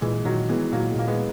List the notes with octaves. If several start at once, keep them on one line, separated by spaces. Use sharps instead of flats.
A#2 E3 G#3
E3
A#2 D#3 F#3
E3 G#3 B3
A#2 F#3 A#3
G#3
A#2 A#3
G#3 B3